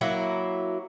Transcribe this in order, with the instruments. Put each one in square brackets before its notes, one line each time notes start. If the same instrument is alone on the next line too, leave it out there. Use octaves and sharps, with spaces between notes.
[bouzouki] F#3 A#3 E4